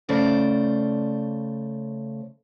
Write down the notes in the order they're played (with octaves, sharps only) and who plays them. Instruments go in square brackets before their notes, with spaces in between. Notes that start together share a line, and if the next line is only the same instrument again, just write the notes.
[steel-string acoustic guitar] C#3 A3 C5 D5